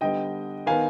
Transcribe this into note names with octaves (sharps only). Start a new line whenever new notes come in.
D3 G3 B3 D#5 G5
D#3 B3 F5 G#5